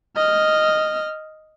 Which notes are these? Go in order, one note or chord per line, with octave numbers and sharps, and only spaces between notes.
D#5 F6